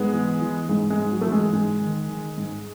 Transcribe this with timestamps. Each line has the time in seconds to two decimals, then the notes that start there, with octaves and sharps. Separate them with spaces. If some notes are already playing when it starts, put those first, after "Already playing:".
Already playing: G#2 G#3 B3
0.13 E3
0.41 E3
0.69 G#2 G#3
0.90 G#3
0.97 G#2
1.11 F#3
1.21 E3 A3
1.32 G#3
1.53 G#2 G#3
1.81 D#3
2.09 D#3
2.38 G#2